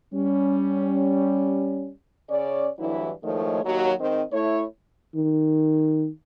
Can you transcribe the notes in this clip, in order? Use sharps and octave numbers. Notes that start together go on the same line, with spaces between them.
G3 C#4
C#3 C#4 C#5 D5
D2 G2 E3 F#3 E4
A2 D#3 F3 G#3 A3 C#5
D#2 F#3
G#2 D#3 C4 C5 D#5
A3 E4 C#5
D#3